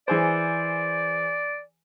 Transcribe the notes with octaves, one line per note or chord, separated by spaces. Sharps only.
E3 G#4 C5 D5